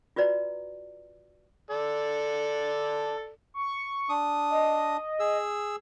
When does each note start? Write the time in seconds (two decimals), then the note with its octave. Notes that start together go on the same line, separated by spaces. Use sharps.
0.16 F4 F#4 B4 D5 A#5
1.71 A4 D5
3.54 C#6
4.09 D4 D#6
4.50 D#5
5.20 G#4 E6